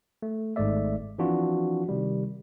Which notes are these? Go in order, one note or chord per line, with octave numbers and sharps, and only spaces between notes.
A3
G#1 G#2 G#3 A3 D5 E5
E3 F3 C4 D4 F4 F#4
C3 D#3 G3